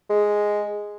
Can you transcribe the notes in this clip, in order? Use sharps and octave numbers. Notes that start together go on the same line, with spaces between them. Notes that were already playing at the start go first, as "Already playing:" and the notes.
G#3